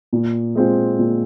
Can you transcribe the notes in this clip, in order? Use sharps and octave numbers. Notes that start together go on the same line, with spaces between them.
A#2
G#3 C4 F4
A#2